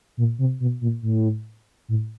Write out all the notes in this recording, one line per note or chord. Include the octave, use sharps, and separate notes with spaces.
A#2
C3
B2
A#2
A2
A2